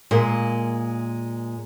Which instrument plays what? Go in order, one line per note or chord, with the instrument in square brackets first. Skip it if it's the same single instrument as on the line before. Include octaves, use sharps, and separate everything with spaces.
[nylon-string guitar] A#2 G#3 A#3